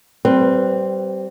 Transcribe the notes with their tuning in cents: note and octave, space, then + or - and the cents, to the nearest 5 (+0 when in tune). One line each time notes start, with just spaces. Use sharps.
G3 -25 C4 +0 B4 +0